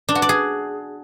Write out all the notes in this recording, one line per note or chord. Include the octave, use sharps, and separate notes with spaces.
D4
F#4
D5
G#4